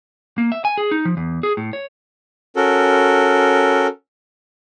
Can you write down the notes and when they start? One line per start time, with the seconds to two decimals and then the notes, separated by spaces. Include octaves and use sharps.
0.38 A#3
0.52 E5
0.65 G#5
0.78 G#4
0.91 D#4
1.05 F3
1.17 E2
1.43 G#4
1.57 A2
1.73 C#5
2.56 C#4 F#4 A4 A#4